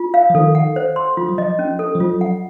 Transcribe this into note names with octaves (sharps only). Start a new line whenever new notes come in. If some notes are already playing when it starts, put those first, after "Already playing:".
Already playing: F4
F5
F3
D#3 A4
F#5
C5
C6
F3 F4
F#3
F3 D#5
C#4
A4
F3
F#3 F4
F#5